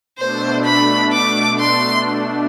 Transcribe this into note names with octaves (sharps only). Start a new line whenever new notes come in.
B2 A3 D4 C5
B5
D6
C6